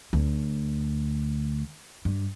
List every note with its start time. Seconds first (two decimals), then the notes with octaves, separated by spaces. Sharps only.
0.13 D2
2.05 G2